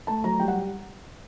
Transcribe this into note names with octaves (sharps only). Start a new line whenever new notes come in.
A3 A5
F#3 A#5
G3 G5
F#5